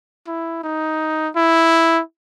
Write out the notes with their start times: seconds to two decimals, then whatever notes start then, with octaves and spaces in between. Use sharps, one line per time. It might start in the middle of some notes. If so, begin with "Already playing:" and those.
0.27 E4
0.64 D#4
1.36 E4